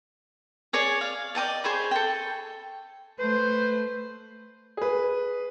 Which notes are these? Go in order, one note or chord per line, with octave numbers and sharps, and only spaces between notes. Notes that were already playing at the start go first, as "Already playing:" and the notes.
G#4 C#5 D5 G#5
F5
D5 D#5 G5 A5
G#4 C5 C#5 B5
A4 G5
A3 B4 C5
G#4 B4